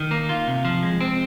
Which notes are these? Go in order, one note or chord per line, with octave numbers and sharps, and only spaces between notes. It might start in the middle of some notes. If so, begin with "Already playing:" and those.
Already playing: D#3
A#3
F4
C3
F3
G#3
C4